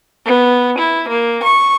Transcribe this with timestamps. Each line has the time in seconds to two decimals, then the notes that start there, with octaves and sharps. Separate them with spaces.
0.23 B3
0.77 E4
1.08 A#3
1.44 C#6